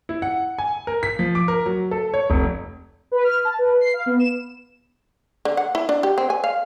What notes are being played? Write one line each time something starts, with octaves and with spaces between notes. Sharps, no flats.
E4
F#5
G#5
A#4
B6
F3
D6
A#4
F#3
A4
C#5
F1
B4
F6
A5
B4
C7
F5
B3
E7
D3
F#5
E4
D4
G4
C4
G#5
F5